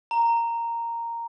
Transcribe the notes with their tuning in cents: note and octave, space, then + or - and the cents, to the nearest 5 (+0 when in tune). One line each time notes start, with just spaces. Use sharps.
A#5 -5